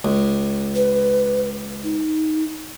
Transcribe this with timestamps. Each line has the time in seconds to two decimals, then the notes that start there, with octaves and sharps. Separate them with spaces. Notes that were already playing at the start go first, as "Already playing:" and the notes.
0.05 C#2
0.75 B4
1.84 D#4